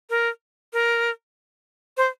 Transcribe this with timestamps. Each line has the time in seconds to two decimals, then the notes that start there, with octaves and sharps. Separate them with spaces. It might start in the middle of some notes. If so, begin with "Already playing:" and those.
0.10 A#4
0.73 A#4
1.97 C5